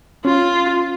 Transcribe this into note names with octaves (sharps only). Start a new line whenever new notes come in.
C#4 F4